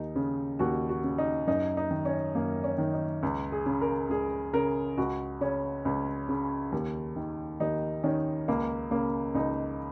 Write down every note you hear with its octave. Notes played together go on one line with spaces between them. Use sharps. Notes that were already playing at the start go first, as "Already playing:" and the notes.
Already playing: D#2 D#4
C#3
D#2 F#4
F#4
C#3
D#4
F#2 D#4
D#4
D#3
C#4
F#2 A#3
C#4
D#3
D#4
C#2
G#4
C#3
A#4
C#2 G#4
C#3 A#4
C#2 F#4
C#3 C#4
C#2
C#3
D#2
D#3
D#2 D#4
D#3 C#4
C#2 A#3
C#3 A#3
C#2 D#4